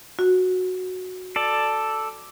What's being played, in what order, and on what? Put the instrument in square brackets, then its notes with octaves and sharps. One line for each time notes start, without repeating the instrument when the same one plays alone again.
[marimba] F#4
[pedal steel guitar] A4 D5